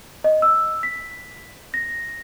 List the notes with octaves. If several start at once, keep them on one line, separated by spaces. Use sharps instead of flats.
D#5
E6
B6
A#6